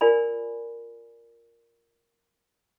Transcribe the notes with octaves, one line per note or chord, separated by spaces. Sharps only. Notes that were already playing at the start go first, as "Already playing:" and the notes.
F4 A#4 D5 G#5 B5